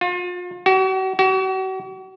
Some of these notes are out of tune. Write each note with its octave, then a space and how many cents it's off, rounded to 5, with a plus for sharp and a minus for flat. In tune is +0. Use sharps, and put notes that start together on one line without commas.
F4 +35
F#4 +40
F#4 +40